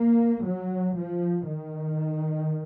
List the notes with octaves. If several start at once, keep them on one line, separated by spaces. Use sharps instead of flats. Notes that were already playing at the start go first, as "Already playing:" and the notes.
Already playing: A#3
F#3
F3
D#3